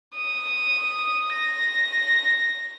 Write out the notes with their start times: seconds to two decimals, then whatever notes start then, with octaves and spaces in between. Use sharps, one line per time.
0.16 D#6
1.32 A#6